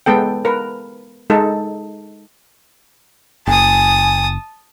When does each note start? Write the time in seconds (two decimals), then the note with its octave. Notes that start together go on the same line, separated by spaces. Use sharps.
0.06 G#3 B3 A4 G5
0.45 A#4 B4
1.30 G#3 D#4 A4
3.47 F#1 G#5 A5 D#6